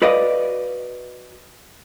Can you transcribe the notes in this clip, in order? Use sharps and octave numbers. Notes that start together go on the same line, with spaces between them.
F#4 B4 D5 D#5 F5